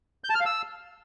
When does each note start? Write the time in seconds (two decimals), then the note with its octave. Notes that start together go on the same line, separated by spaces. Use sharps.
0.24 G6
0.29 A5
0.35 F6
0.40 F5
0.46 E6